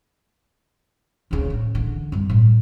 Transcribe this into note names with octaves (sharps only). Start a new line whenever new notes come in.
D2 C#3
A1
D3 E3
G2 G3
A2